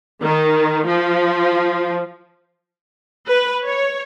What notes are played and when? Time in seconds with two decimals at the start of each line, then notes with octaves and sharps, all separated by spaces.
0.22 D#3
0.86 F3
3.27 B4
3.63 C#5